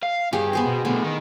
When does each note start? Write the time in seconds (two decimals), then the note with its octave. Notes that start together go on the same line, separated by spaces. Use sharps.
0.03 F5
0.33 G2 G4 G#4 C#5
0.53 B3 G#4 C5
0.66 B2
0.85 A2 D3 B3
1.04 D#3